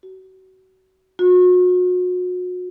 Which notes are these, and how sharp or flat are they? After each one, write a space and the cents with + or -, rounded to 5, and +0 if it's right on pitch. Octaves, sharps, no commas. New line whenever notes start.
F#4 +30
F#4 -35